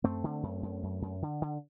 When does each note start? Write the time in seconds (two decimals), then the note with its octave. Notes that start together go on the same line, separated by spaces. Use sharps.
0.04 F#2 A3 C4
0.24 D3
0.43 F#2
0.63 F#2
0.83 F#2
1.02 F#2
1.22 D3
1.42 D3